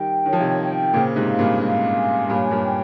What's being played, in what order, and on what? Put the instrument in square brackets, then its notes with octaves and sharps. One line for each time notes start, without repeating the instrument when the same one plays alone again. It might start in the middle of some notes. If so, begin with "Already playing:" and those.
Already playing: [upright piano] D#3 G3 [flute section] G5
[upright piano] D#3 [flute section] C#5
[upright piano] F3
C3 D#3
[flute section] G5
[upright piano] A#2 C#3 [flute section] C5
[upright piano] G#2 C3
[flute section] F5
[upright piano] G2 A#2
[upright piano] G#2 [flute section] F5
[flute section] G#5
[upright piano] G2 A#2 [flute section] C#5
[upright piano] G2 A#2
[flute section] G5